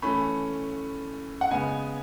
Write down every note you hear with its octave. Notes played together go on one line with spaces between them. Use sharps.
E3 A3 C#4 B5
F#5
C#3 G#3 B3 G#5